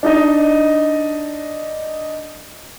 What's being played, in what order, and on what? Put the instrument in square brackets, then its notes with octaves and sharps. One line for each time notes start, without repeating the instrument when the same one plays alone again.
[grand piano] D4 D#4 D#5